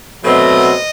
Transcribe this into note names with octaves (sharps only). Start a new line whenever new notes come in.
B2 F#3 A3 C4 D#5